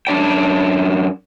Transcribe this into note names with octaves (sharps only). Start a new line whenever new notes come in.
F#2 D4 D5 G5